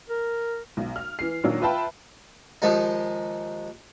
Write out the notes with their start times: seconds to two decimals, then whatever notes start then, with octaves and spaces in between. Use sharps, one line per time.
0.10 A#4
0.77 B1
0.96 F6
1.19 E3 C7
1.44 A#2 D#3 F#3 D4
1.61 F4 B4 E5 G5 A5 B5
2.62 D#2 F3 G#3 D#4